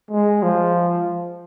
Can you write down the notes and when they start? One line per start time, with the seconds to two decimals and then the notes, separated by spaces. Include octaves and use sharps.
0.11 G#3
0.43 F3